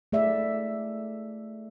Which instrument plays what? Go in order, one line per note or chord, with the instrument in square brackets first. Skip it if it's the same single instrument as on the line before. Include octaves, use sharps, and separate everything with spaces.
[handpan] A3 G#4 D5 E5